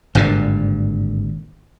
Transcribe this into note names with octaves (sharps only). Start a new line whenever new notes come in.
G#1 G2 A#2 D3